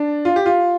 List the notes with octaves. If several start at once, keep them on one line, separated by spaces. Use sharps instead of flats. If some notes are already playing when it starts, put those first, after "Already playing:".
Already playing: D4
F4
G4
F4